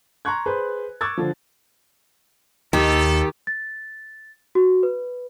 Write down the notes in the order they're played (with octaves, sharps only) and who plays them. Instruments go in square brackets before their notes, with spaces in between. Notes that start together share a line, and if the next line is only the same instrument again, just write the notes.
[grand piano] A#5 C6 C#6 F#6 G#6
G#4 B4 C5
C#6 D6 E6 F#6 G#6 A6
D3 F3
[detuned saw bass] D#2 [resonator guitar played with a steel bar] D#3 [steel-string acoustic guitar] G4 [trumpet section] A4
[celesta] A6
F#4
B4